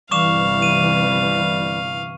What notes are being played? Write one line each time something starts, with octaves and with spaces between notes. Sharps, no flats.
G1 C3 E3 G3 F5 C#6 D6 E7
D#7